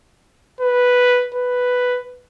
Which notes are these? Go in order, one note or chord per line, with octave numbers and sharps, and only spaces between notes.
B4
B4